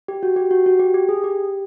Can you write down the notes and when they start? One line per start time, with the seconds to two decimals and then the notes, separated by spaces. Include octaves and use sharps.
0.08 G4
0.23 F#4
0.36 G4
0.51 F#4
0.66 F#4
0.80 G4
0.94 G4
1.09 G#4
1.24 G4